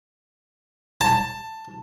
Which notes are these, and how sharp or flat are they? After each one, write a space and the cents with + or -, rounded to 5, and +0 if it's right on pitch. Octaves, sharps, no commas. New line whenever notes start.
A5 +10